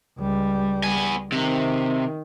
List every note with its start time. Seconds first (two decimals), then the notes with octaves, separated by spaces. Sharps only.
0.19 C#2 G3
0.84 B3 G#5
1.32 C3 D#3